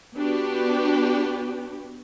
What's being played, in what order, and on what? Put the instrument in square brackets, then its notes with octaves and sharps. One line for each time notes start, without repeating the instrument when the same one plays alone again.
[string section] B3 D4 F#4 G4 B4